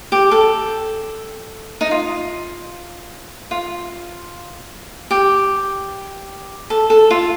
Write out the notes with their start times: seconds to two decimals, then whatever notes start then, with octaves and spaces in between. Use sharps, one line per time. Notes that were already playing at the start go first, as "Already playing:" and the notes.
0.12 G4
0.31 A4
1.81 D#4
1.91 F4
3.51 F4
5.11 G4
6.70 A4
6.90 A4
7.11 F4